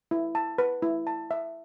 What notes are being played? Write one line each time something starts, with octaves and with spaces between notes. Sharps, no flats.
E4
A5
B4
E4
A5
E5